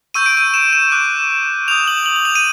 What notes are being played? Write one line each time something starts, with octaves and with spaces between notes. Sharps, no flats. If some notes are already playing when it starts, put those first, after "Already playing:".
C#6 E6 G6 D#7
D7
D#7
E7
E7
D6 F#6
D#6 G6 F7
F#7
F#7
F#7
F7
D#7